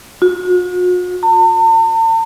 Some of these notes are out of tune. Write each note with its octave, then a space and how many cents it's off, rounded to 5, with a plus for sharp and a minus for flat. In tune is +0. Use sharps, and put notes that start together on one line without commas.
F#4 -45
A5 +45